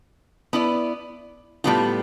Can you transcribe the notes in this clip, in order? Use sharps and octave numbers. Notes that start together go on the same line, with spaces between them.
B3 E4 B4 D5
A2 G3 B3 F4